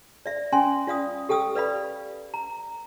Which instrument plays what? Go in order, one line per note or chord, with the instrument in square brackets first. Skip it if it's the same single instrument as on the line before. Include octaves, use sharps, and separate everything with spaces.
[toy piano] D5 E5
C#4 G5 G#5 C6
F4 D5 F5 D#6
G4 A4 G5 D#6 E6
B4 D5 F5 B5
A#5